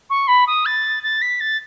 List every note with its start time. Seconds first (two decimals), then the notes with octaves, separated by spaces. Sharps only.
0.10 C#6
0.27 B5
0.47 D#6
0.65 A6
1.03 A6
1.21 B6
1.40 A6